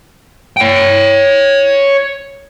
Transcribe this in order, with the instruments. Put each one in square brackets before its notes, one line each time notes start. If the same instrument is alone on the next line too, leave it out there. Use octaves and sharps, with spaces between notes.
[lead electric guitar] C#5 G5